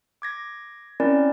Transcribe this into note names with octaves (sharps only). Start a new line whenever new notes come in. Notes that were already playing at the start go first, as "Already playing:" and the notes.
D6 G#6 A#6
C4 C#4 E4 A#4 D5